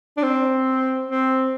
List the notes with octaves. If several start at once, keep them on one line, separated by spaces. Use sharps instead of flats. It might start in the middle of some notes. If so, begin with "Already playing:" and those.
D4
C4
C4